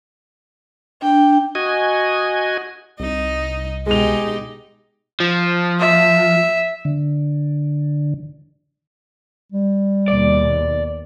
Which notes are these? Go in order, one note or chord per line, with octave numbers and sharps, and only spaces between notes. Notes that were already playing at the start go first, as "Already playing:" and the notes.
D4 G5
F#4 D#5 G#5
C2 D#4
B2 G#3 D#4 G4 G#4 F7
F3
E5
D3
G3
D#2 B2 D5